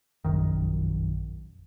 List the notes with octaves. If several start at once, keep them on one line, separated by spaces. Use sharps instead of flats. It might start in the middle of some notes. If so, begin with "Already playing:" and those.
F1 A#1 F#2 D#3